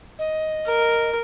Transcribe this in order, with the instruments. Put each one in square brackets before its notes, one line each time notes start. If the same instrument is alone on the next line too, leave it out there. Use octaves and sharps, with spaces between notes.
[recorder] D#5
[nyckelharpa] A#4